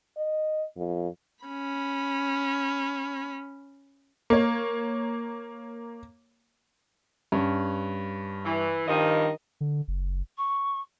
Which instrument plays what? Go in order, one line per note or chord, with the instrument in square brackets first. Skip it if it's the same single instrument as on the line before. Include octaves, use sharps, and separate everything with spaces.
[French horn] D#5
F2
[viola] C#4 B5
[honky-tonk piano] A#3 C#5
[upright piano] G2 C#4
[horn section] E3
[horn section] G2 F3 D#5 [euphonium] D#3
[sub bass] D3
F#1
[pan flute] C#6